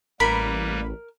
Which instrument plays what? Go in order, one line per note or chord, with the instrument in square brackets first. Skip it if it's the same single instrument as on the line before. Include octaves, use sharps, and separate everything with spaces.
[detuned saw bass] A1 [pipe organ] G3 A#3 B4 [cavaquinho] A#4 [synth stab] B5